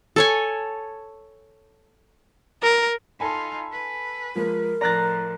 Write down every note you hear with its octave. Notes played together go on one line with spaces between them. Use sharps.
A4 C#5 G#5
A#4
D#4 F4 A4 G#5 B5
B4
F3 G#3 A#4
A2 F3 D5 A#5 F#6 A6